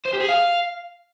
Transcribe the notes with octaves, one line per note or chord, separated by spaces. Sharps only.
C5
G4
G#4
F5